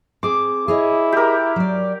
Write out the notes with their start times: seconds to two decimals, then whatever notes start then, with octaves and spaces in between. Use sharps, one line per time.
0.23 C4 G#4 D6
0.68 E4 G#4 C#5 D#5
1.12 G4 A#4
1.56 F#3 D5